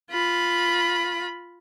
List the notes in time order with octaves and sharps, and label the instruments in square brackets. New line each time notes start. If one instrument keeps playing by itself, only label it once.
[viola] F4 B5